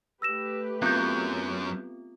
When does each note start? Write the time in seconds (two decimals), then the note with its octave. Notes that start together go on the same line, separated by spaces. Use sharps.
0.22 A3 G4 B4 E6 A#6 E7
0.82 F#2 B3 C4 F4 F#6 G6